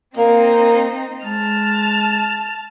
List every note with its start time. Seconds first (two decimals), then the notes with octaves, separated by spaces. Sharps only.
0.17 A#3 C4 D#4
1.24 G#3 A5 F6